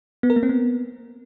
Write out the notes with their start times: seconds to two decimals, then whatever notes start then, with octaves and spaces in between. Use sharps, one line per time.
0.23 B3
0.30 A#4
0.36 A#3
0.43 C4
0.49 B3